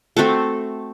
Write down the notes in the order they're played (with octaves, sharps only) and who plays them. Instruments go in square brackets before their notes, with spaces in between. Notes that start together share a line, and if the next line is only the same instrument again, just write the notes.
[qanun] A3 C4 F#4 A4